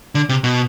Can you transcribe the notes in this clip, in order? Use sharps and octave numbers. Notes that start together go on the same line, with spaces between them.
D3
C3
B2